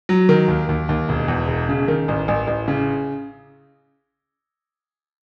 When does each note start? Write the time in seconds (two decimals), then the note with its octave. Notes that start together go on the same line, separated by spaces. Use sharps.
0.09 F#3
0.29 D#3
0.48 D#2
0.69 D#2
0.89 D#2
1.09 E1
1.28 E2
1.48 E1
1.69 C#3
1.88 D#3
2.08 A1
2.28 A1
2.47 A1
2.68 C#3